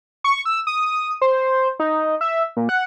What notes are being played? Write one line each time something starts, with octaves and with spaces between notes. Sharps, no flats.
C#6
E6
D#6
C5
D#4
E5
A#2
F#5